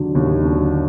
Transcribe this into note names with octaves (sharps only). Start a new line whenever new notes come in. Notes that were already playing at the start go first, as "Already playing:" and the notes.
Already playing: D#2 D3 F#3
D#2
D3 F#3